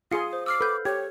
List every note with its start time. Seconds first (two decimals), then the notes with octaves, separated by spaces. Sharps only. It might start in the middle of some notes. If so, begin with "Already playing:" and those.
0.11 F4 G#4 F5 C6 D#6 C#7
0.33 C5
0.46 D6 E6 F6 C7
0.61 A4 B4 G6
0.85 G4 C#5 G#6